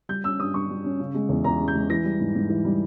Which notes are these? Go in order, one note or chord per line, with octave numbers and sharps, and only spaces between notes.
G3 G6
C#4 E6
G2 D#6
G2 C#6
G3
C#4
C#3
G#3
E2
E2 A#5
C#3
G6
G#3
E3 A#6
G3
G#2
G#2
E3
G3